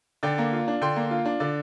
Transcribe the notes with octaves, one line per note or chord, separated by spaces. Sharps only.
D3 D5 G5
A#3
F4
D4
D3 G5 C6
A#3
F4
D4
D3 D5